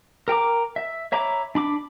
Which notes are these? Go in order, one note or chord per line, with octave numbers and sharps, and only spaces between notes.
A#4 G5 A#5 D6
E5
C#5 E5 A#5 B5 D6
D4 B5 D6